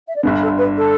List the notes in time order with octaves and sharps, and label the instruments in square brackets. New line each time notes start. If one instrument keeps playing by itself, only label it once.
[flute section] E5
D5
[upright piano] G1 G2 D3 [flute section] B4
[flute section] A4
B4
A4